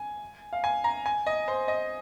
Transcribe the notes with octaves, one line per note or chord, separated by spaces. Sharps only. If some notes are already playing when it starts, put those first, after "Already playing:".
Already playing: G#5
F5
G#5
A#5
G#5
D#5
C5
D#5